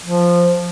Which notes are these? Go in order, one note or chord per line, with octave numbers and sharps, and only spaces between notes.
F3